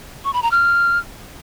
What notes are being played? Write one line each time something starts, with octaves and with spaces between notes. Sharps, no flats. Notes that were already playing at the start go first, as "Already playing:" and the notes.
C#6
B5
A#5
F6